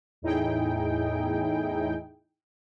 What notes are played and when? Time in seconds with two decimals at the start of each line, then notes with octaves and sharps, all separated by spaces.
0.22 E2 A2 D#4 E4 G#4 G5